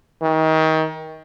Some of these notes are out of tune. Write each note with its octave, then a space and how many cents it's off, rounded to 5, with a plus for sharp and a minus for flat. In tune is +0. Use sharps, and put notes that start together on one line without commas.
D#3 +30